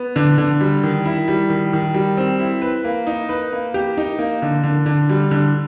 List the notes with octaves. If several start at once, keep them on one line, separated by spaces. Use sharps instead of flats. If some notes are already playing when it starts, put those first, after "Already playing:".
Already playing: B3
D3
D3
G3
D#3
E4
G3
D#3
D#3
G3
C4
E4
B4
A#3
D#4
B4
A#3
G4
D#4
A#3
D3
D3
D3
G3
D3